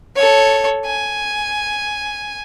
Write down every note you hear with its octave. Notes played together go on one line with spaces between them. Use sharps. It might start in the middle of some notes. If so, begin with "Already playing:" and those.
A4 C#5
G#5